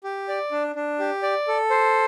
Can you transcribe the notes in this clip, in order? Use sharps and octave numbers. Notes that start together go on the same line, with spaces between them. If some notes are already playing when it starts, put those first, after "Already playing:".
G4
D5
D4
D4
G4
D5
A4
C5